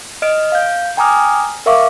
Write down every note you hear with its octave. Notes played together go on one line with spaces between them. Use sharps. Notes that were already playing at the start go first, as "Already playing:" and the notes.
D#5 F6 D7
F5 G6
G5 G#5 A#5 D6 D#6 F6
A#4 E5 F5 C#6 D6